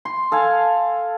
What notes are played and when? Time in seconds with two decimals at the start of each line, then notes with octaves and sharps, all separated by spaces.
0.05 C6
0.32 A4 F5 G#5